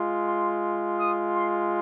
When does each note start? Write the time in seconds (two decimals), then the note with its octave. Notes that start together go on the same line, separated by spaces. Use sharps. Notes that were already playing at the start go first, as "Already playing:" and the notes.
Already playing: G#3 F4
0.25 C6
1.00 D#6
1.36 C6